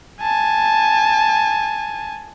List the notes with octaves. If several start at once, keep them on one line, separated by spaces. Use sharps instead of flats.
G#5 A5